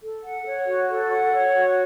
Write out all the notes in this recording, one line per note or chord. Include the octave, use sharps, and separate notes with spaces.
A4
F#5
C#5
F#4
A4
F#5
C#5
F#4